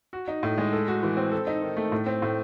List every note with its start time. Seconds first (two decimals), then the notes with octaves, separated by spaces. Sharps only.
0.13 F#4
0.28 D#4
0.43 A2
0.58 G#3
0.73 A4
0.88 F#4
1.03 E3
1.17 C4
1.32 A4
1.47 D#4
1.62 D#3
1.77 A3
1.92 A2
2.06 C4
2.22 A2